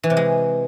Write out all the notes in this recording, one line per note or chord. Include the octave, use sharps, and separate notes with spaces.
E3
C3
G#3